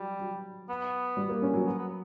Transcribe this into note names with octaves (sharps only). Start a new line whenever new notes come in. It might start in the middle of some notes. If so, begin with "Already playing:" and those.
Already playing: F#3 G3
F#3
B3
G3
A#3
C#4
F#3
B3
B3